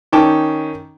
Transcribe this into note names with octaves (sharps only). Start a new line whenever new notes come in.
D#3 C#4 G5 A5 D6